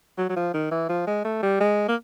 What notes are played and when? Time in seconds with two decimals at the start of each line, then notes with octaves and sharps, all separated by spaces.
0.18 F#3
0.29 F#3
0.36 F3
0.54 D#3
0.72 E3
0.90 F3
1.07 G#3
1.25 A3
1.43 G3
1.61 G#3
1.89 A#3